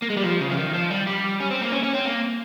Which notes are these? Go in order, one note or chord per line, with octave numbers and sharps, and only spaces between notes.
A#3
G#3
G3
F3
C#3
F3
D#3
F3
G3
G3
C#4
C4
A#3
C#4
C#4
C4
A#3